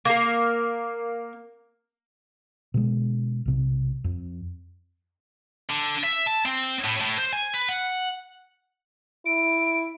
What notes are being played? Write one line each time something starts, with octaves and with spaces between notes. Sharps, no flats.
A#3 A#4
B2 D3 G#3
B1 C3
F2
D3
E5
A5
C4
A2
A2
C5
G#5
B4
F#5
E4 D7